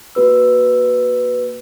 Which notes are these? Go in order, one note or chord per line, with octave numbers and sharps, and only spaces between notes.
A#3 F#4 B4 E6